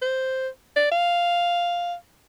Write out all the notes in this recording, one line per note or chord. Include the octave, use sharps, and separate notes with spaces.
C5
D5
F5